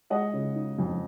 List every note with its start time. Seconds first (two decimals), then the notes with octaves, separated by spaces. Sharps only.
0.10 G#3 D#5 F#5
0.33 C#3
0.55 D#4
0.79 F2